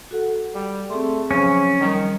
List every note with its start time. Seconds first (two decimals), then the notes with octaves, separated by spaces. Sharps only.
0.11 F#4 A4 F#5
0.55 G3
0.90 A3 C4 G#4 C6
1.31 C#3 F3 F#3 C#4 C5
1.81 D#3 G3